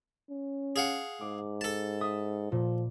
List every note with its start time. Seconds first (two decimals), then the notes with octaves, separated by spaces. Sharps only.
0.30 C#4
0.76 G#4 F5 F#5
1.21 G#2 D6
1.61 A4 A5
2.01 E5 D#6
2.52 A#2 F3